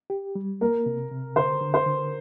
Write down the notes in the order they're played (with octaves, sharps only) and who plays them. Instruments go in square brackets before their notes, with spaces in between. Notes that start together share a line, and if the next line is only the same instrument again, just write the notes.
[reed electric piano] G4
G3
[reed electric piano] A#3 [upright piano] A#4
[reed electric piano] C3
C3
[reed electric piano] D3 [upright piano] C5
[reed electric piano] D3
[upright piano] C5
[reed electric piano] D3